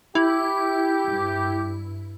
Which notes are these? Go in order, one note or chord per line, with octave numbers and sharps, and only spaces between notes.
E4 G4
G2